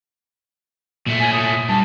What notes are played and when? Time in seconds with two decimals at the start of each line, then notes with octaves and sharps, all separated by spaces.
1.07 A#2 A3
1.20 G#5
1.33 D#6
1.69 G2 A5